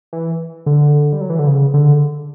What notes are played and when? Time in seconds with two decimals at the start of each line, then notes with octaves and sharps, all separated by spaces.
0.13 E3
0.66 D3
1.13 G3
1.21 F#3
1.30 E3
1.39 D3
1.47 C#3
1.74 D3